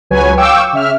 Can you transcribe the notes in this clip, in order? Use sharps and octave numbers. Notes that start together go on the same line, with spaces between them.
C#2 F#3 B4 C#5 G#5
F5 G5 C#6 D6 E6
C#3 E5 F6